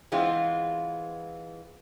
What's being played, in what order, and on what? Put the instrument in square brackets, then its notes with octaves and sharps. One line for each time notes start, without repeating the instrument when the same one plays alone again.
[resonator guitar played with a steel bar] E3 G#3 B3 C4 F4